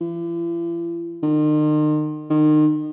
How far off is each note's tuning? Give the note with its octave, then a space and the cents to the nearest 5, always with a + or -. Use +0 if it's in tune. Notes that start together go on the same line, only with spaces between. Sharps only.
E3 +45
D#3 -40
D#3 -30